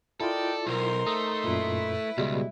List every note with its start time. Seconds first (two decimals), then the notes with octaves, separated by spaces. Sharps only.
0.20 E4 F4 A4 A#4 D5 D#5 G5
0.67 B1 D#4 A#4 C5 C6
1.07 A3 A#5 D#6
1.44 F#2 A#2 E4 B4
2.18 C#2 B2 G3 G#3